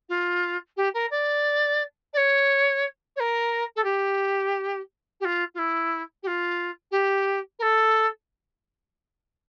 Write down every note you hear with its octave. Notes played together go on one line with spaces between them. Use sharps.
F4
G4
A#4
D5
D5
C#5
C#5
A#4
A4
G4
G4
F4
F4
E4
G4
F4
G4
A#4
A4